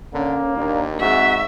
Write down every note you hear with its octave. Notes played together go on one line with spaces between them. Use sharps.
D3 A#3 C#4
D#2 D4
G#2 C4 F#4 G#4 E5